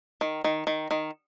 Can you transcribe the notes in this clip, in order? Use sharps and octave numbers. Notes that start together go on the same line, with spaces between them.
D#3
D#3
D#3
D#3